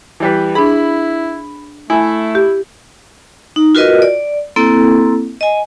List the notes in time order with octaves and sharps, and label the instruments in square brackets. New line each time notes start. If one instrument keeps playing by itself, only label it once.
[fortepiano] E3 G3 B4
[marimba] D4 G#4 [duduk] E4 [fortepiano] B5
[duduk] A3 [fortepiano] E4 [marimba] G#5
[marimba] G4
[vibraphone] D#4
F4 F#4 A#4 B4 D#5
D5
A#3 C4 E4 A4
D#5 G#5